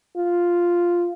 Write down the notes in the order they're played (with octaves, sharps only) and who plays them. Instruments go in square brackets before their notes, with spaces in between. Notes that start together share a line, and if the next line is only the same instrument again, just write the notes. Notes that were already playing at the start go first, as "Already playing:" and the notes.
[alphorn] F4